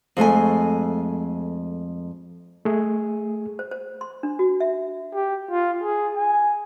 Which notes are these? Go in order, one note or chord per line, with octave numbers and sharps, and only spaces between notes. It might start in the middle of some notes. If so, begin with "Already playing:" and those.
F2 G#3 A3 G#5
A3 G#4
C5
C5
C6
D4
F#4
E5
G4
F4
G#4
G#5